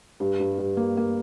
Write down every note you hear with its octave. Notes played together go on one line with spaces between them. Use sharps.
G2
G2
G2
A#3
A#3